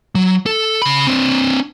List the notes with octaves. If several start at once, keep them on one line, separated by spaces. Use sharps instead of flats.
F#3
A4
C#3 B5
C4 D4